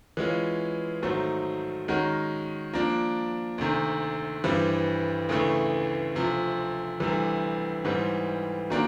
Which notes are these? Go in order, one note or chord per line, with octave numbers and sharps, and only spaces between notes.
E3 G#3 C#4 F4
G#2 D#3 F#3 A3 C4
D#3 G#3 C#4 F#4 A#4
F3 A#3 D4
D2 C3 D#3
G2 E3 G3 C4
D2 C#3 E3 A3
D2 C3 F3
D2 C3 E3 G3
G#2 E3 G3 C4
D#3 F#3 A#3 D4